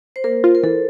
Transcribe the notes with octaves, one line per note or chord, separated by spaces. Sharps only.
C5
A#3 A#4
F4
A#4
E3 A4